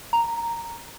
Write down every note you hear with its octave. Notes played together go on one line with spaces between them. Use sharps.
A#5